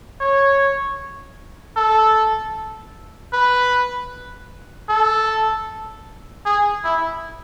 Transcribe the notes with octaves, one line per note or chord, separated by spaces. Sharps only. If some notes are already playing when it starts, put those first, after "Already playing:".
C#5
A4
B4
A4
G#4
E4